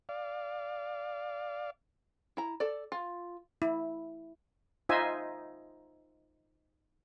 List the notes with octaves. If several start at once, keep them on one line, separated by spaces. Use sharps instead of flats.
D5 F5
E4 A#5
A4 D5
F4
E4
D#4 F4 C5 D#5 E5 G#5